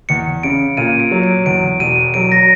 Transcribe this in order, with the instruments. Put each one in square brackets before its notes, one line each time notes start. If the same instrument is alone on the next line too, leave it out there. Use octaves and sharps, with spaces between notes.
[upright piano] E2 [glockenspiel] C#7
[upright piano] C#3 [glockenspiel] D7
[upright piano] A#2 [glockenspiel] D#7
[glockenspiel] D7
[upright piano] F#3
[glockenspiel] D7
[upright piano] E2 [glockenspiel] D7
[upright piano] E1 [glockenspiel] D#7
[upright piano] F#3 [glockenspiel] D7
[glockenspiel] A#6